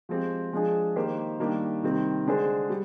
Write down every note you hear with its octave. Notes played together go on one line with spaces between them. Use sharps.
F3 G#3 C4 G4
F3 G#3 D4 G#4
D#3 A#3 D#4 G4 C5
D#3 G3 A#3 D4 G4
C3 D#3 G3 C4
D3 G#3 D4 G#4 C5
G3